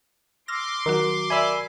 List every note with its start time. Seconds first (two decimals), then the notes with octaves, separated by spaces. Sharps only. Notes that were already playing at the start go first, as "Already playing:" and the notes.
0.48 C6 D6 E6 F6 A#6
0.86 D#3 F#3 F#4 A#4
1.30 A#4 D5 E5 G#5 B5 E6